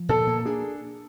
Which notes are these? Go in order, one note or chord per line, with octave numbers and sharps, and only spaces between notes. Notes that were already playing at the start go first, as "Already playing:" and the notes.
Already playing: F3
A#2 A4
A#3
D4 G#4